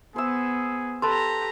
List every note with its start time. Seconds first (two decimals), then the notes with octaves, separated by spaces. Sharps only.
0.16 B3 G#4 C5 E6
1.02 G4 A4 B4 A#5 C6